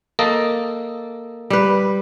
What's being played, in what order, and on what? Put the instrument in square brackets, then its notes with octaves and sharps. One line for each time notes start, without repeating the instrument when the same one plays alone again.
[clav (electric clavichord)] A#3 A4 D#5
[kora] G3 B4